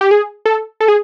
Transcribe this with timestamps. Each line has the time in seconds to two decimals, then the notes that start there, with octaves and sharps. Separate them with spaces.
0.01 G4
0.11 G#4
0.45 A4
0.80 A4
0.88 G#4